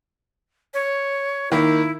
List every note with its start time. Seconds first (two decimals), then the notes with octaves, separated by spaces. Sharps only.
0.74 C#5
1.52 D#3 A#3 E4